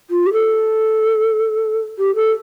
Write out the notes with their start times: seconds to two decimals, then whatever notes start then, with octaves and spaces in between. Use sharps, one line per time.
0.10 F4
0.26 G4
0.33 A4
1.98 G4
2.15 A4